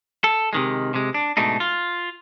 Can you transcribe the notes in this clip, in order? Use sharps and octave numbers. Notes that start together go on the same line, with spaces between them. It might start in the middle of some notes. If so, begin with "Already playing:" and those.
A4
C3 D#3 G#3
C3 G#3
D4
G#2 B2 A3 D4 D#4
F4